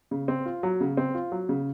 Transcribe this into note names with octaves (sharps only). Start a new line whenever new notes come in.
C#3
C4
F4
F#3
C#3
C4
F4
F#3
C#3